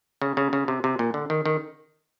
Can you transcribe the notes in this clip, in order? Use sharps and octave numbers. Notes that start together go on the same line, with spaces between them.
C#3
C#3
C#3
C3
C3
A#2
D3
D#3
D#3